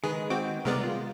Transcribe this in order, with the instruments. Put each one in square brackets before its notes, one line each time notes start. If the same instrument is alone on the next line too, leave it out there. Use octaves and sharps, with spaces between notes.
[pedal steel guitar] D#3 G#3 [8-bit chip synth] G#4 [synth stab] B4
[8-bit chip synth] C4 [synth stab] F#4 G5 D6
[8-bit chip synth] C3 G#3 B3 [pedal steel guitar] G3 [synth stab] A#4 D5
[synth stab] F4